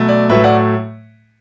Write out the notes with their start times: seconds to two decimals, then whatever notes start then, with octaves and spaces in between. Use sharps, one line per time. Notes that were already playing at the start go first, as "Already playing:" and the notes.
Already playing: B2 F#3 A3
0.08 D5
0.29 A2 F#3 A3 B4 E5
0.44 D5 F#5